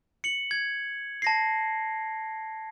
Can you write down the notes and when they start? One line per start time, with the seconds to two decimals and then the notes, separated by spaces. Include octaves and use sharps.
0.24 C#7 F#7
0.51 G#6
1.22 A5 A#6 C7